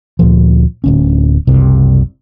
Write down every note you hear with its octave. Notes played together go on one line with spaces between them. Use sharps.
D2 A#2 F3
D1 D2 C#4
F#1 C2 C3